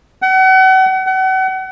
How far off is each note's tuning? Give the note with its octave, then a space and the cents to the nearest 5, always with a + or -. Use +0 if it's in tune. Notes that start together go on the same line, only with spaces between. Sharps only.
F#5 +35
F#5 +35